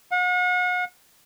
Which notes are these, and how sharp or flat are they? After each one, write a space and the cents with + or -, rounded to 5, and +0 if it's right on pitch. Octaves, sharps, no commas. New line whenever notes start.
F#5 -40